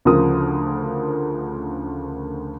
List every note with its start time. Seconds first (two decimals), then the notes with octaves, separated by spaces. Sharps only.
0.05 D2 C#3 F3 A#4 D#6